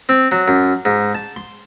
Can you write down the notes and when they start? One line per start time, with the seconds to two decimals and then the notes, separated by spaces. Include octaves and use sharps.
0.09 C4
0.32 F#3
0.48 F#2
0.85 G#2
1.15 A5
1.36 C6